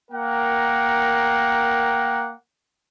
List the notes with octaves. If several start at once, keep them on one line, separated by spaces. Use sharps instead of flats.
A#3 A#4 F#5 G5